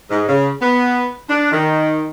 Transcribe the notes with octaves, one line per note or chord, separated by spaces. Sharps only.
G#2
C#3
B3
D4
D#3